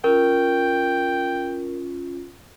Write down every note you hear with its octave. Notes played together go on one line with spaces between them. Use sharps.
C#4 F4 A#4 G5